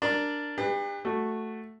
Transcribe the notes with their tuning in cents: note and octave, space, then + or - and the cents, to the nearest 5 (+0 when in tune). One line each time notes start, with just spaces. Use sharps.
D4 +0 A#4 +0 D5 +0
D4 +40 G4 +40 B4 +0
A3 +0 F#4 +0